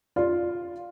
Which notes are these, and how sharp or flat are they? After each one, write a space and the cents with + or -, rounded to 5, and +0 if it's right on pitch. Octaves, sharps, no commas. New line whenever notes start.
F4 +0 D5 +0 F5 +0